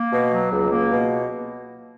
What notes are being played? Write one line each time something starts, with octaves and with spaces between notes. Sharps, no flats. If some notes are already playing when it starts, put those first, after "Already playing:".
Already playing: A#3
B2
F#3
C#2
A#3
B2